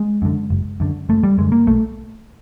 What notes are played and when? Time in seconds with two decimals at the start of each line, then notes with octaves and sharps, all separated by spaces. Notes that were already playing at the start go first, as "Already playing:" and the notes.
Already playing: G#3
0.22 F#2 D3
0.50 F#1
0.80 F#2 D3
1.09 F#1 A3
1.23 G3
1.38 F#2 D3 G#3
1.52 A#3
1.67 B1 A3